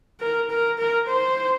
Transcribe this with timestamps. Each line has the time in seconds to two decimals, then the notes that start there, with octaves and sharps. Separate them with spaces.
0.20 A#4
0.50 A#4
0.78 A#4
1.07 C5